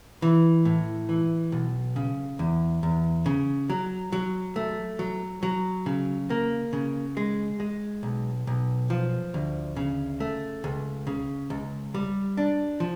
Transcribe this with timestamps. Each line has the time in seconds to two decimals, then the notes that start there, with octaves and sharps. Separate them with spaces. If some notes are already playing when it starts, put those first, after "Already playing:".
0.22 E3
0.65 A2
1.09 E3
1.52 B1
1.96 C#3
2.39 E2
2.83 E2
3.26 C#3
3.70 F#3
4.12 F#3
4.56 A3
4.99 F#3
5.43 F#3
5.86 C#3
6.30 A#3
6.73 C#3
7.17 G#3
7.60 G#3
8.03 B1
8.47 B1
8.90 F3
9.34 D2
9.76 C#3
10.20 A3
10.64 C#2
11.07 C#3
11.50 C#2
11.94 G3
12.37 D4
12.80 F3